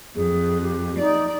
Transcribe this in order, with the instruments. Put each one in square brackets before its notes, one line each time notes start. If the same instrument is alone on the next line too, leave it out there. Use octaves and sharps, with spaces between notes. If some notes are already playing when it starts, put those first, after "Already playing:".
[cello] F2 [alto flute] G#4
[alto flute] G4
[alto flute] D#4 [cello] D5